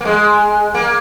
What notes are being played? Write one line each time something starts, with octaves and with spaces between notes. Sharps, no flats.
A#3
G#3
A#3